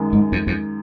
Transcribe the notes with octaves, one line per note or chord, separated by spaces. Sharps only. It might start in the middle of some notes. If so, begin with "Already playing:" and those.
Already playing: F#2 D#3 G#3
G#2
F2
F2